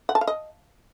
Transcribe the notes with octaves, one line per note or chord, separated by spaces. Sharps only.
F#5
A5
F5
D#5